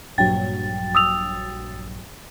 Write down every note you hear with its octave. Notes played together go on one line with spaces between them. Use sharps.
A#1 G2 F#3 G5 A6
D#6 E6 F7